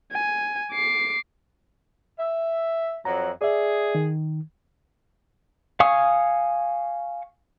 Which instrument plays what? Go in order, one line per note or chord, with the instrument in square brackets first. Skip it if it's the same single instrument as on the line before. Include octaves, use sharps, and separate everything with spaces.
[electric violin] G#5
D6 C7
[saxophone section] E5
[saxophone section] F2 F#3 [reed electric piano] A#5
[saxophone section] G#4 [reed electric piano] D5 E5
[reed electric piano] D#3
[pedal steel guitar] F5 G#5 C#6 D#6